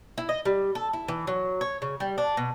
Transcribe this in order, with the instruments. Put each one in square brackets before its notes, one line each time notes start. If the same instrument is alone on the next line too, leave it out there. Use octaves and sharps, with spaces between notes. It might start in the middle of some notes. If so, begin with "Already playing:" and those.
[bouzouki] E4
D#5
G3
A4
E4
E3
F#3
C#5
C#3
G3
D4
B2